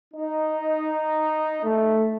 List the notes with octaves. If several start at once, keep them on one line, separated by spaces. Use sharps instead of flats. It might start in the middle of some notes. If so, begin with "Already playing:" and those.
D#4
A3